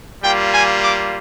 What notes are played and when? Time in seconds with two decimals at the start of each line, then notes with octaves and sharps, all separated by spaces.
0.23 G3 A#3 F4 G5
0.54 G#5
0.83 D6